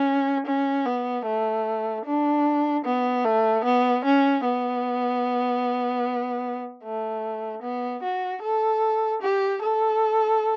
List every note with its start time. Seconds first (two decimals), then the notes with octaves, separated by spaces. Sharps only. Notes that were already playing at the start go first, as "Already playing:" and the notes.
Already playing: C#4
0.46 C#4
0.86 B3
1.26 A3
2.05 D4
2.85 B3
3.25 A3
3.65 B3
4.04 C#4
4.44 B3
6.83 A3
7.62 B3
8.03 F#4
8.42 A4
9.22 G4
9.62 A4